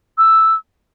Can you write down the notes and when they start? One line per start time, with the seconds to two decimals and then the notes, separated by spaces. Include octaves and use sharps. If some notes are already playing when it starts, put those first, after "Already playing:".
0.18 E6